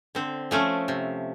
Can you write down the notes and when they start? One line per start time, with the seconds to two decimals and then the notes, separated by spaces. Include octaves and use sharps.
0.15 D3 C4
0.51 F3 A3 C#4
0.88 C3